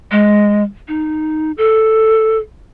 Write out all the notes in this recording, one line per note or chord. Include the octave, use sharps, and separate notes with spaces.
G#3
D#4
A4